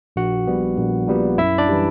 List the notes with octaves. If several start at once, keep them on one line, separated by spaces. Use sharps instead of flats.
A#1 F#4 F#5
A#2 G3 B3
A#1
A#2 G3 B3
F#2 E4 E5
D4 D5
E3 G3